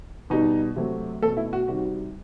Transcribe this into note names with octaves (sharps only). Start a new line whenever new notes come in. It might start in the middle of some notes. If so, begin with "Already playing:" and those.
B2 G3 D#4
C3 F#3 A3
B2 A3 A4
E4
F#4
C3 D#3 G3 F#4